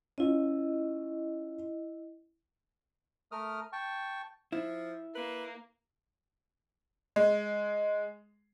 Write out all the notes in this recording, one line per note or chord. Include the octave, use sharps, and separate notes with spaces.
C#4 E4 F4 D#5
A3 A#4 D#6 F6
G5 A5 C#6
F3 E4
A#3 B4
G#3